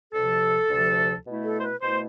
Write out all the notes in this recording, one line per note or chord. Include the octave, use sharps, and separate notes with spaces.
D2 C3 F3 A4
D2 C3 F3
B2 A3 E4
A4
C5
B4
B2 A3 E4 C5